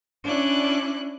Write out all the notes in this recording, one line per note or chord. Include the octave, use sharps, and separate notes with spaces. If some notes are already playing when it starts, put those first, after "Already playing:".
C#4 D4 E4 D5 F#6